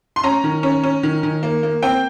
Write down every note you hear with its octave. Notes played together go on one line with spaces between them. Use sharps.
C6
C#4 A#5
D#3
C#4
C#4
D#3
D#3
A#3
A#3
C4 G5